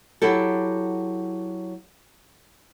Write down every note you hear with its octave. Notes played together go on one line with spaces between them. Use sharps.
F#3 E4 G4 A4